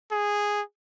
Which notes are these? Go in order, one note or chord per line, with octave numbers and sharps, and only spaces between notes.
G#4